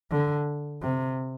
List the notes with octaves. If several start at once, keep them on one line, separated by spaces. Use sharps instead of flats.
D3
C3